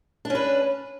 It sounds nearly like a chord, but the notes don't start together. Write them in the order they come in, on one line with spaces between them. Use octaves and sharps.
D4 C#4 B4